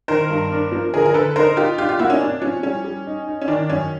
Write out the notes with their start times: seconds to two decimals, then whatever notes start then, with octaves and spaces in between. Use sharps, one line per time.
0.08 D#3 A#4 C5
0.30 G2
0.52 D4
0.72 F3
0.94 D3 G#4 A#4
1.06 A#4
1.14 D3 A4 B4
1.36 D#4 A#4 C5
1.57 D#4 F4 G4
1.78 D4 F4 G4
1.89 F4 G4
1.99 A#3 E4 F#4
2.10 C#4 D#4
2.21 C3 D4
2.41 F3 C#4
2.63 G3 C#4
2.84 G3
3.06 D#4
3.27 D#4
3.41 C#4
3.48 D#3 D4
3.69 F#2 C#4